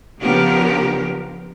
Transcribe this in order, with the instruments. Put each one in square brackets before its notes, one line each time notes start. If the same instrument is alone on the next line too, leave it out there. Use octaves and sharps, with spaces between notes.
[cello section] C#3 F3 B3 D4 G4 A#4